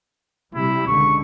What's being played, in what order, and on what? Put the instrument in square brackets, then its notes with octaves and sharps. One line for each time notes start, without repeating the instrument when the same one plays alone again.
[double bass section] C3 G3 [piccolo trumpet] E4
[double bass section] C#2 D3 [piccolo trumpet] C#6